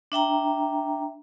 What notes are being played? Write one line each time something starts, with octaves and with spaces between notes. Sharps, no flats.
D4 E5 G5 A#5